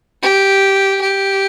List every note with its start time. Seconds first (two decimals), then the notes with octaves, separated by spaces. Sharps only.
0.22 G4
1.01 G4